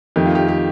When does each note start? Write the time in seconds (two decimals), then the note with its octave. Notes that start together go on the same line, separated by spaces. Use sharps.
0.16 F2 D#3 A3 G4
0.26 F4
0.35 G4
0.48 G4